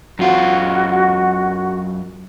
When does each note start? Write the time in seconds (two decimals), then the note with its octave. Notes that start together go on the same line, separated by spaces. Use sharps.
0.19 F#2 F4 F#4